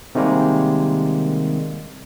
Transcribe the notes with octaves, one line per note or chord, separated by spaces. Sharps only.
C3 D#3 G3 G#3 A#3